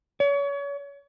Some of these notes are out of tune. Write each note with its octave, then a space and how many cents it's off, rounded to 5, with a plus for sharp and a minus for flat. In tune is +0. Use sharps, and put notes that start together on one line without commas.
C#5 +35